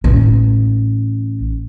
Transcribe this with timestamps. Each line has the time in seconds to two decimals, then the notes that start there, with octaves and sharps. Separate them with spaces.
0.04 A1 D#4